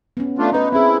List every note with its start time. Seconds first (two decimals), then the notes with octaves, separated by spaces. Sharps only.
0.17 B3 C#4
0.38 A3 D4 F4
0.52 C#4 D#4 B4
0.72 C4 E4 G#4